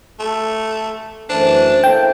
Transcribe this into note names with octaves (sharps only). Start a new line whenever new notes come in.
A3
F#2 E3 A3 D4 C5
A#3 E4 A4 G5